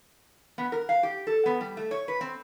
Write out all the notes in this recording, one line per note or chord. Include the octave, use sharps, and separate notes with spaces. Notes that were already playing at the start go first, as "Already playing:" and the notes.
B3
A#4
F5
G4
A4
B3
G3
A3
C#5
B4
C4